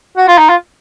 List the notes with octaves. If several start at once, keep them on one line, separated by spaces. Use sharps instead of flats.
F#4
F4
D#4
F4